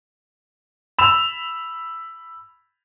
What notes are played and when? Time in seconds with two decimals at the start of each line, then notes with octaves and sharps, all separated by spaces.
0.98 B5 E6 E7 F7